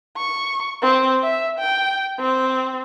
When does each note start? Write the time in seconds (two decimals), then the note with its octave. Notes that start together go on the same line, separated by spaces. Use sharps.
0.17 C#6
0.83 C4
1.23 E5
1.59 G5
2.20 C4